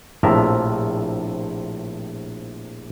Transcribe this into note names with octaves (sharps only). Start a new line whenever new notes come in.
A#1 A2 C3 F3 A#4 E5